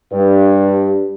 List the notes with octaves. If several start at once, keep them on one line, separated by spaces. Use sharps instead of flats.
G2